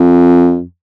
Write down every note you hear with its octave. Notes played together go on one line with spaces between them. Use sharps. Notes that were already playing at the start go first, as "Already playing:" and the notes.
Already playing: F2